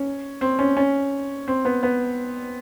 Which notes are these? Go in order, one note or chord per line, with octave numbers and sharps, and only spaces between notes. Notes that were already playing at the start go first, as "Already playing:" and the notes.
Already playing: C#4
C4
C#4
C#4
C4
B3
B3